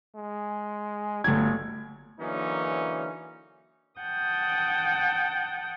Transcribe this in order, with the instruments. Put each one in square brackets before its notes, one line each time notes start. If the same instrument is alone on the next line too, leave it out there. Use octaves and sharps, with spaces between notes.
[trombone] G#3
[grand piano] G1 G#6 [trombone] F#3 [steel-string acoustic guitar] A3 A4 G5
[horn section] D3 E3 F#3 A#3 C#4 D#4
[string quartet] F#5 G5 A5 D#6 G6